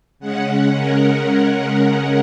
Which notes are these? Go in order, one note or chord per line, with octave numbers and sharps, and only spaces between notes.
C#3 G#3 C#4 F#5
A#4
A#4